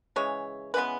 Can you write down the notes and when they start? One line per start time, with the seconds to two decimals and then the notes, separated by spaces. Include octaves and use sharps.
0.16 C#3 E3 G#3 C#5
0.74 C#3 E3 G#3 B3 B4